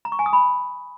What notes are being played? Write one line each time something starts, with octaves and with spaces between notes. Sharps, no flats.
A#5
C#6
G#5
D#6
B5